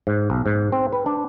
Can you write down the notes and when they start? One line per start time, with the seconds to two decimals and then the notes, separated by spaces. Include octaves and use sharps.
0.07 G#2
0.30 B1
0.46 G#2
0.72 C4
0.93 B4
1.06 D4